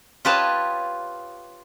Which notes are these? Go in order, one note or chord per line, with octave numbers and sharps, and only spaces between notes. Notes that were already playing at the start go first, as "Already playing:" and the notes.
F4 G4 B4 C#5 D#5 A5